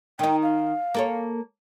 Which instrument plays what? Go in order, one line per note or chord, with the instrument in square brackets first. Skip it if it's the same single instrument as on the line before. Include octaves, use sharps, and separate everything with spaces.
[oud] D#3 D#4 [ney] G5
[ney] F5
[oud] A#3 A4 C#5